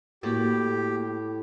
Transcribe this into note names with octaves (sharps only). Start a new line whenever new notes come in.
A2 A#3 F#4 G4